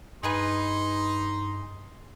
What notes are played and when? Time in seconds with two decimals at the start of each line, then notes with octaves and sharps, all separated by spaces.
0.23 G2 D#4 G#4 B4 G#5 C6